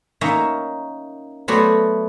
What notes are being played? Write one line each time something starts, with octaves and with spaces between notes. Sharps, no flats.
A#3 C#4 D#4 C#5 E5
F#3 A3 B3 F#4 C5 D5